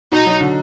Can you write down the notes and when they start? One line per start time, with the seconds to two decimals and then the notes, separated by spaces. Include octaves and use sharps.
0.12 B2 D#4
0.26 F#3
0.40 D3